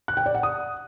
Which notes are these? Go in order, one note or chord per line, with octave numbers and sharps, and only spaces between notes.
F#6
G5
D5
F#5
D#6